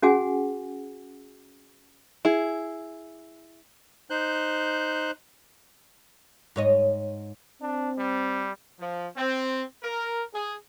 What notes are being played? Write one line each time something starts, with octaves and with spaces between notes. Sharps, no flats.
C#4 F#4 G#4 F#5 G#5
E4 G#4
D#4 C5 F#6 G6
G#2 C#5 D#5
C4 D4
G3
F3
C4
A#4
G#4